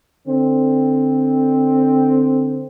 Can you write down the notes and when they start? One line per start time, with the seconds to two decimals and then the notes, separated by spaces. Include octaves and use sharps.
0.26 D3 C4